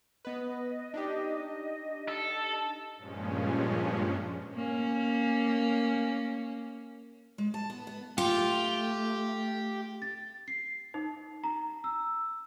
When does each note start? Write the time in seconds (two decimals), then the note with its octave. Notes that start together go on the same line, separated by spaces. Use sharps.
0.25 B3 B4 D#5
0.94 D4 D#4 G4
2.08 A4
2.97 G2 A#2 F3 G#3 C#4
4.54 A#3 C#4
7.38 G#3
7.54 A5
7.70 B3
7.87 B3
8.18 A3 F4 G4
10.02 A6
10.48 C7
10.94 D#4
11.44 A#5
11.84 E6